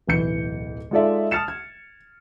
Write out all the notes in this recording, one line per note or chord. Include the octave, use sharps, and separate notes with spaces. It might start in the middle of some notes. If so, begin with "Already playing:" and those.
D1 B1 E3 B4 G6 C#7
G#3 D#4 F4 A4 D5 E5
A5 D#6 F6 A6 C#7 E7
G#6